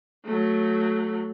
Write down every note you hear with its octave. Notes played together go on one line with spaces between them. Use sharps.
F#3 A3